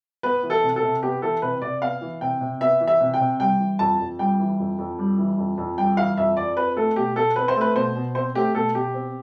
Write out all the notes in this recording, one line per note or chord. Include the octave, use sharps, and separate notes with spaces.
B3 B4
E3
A4
C3
A4
C3
B3 G4
E3 A4
C3 B4
C3 D5
B3 F5
E3
C3 G5
C3
B3 E5
E3
E5
C3
G5
C3
G3 G5
E3
F2 A5
F2
G3 G5
E3
F2
F2
G3
E3
F2
F2
G3 G5
E3 F5
F2 E5
F2 D5
C4 B4
A3 A4
B2 G4
B2 A4
C4 B4
C5
A3
B4
B2 C5
B2
C4 C5
A3 G4
B2 A4
B2 G4
C4